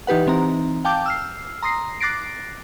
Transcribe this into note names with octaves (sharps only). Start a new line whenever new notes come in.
E3 D#4 G4 B4 F#5
E3 C4 D#4 A#5
F5 G5 A5 D6 G6
E6 F6 C7
A#5 C6 D#6 A#6 C7
D6 F#6 A6 A#6 C7 D7